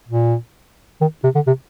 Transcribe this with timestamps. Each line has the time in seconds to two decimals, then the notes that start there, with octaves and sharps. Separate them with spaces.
0.08 A#2
1.01 D#3
1.24 C3
1.35 D3
1.47 C3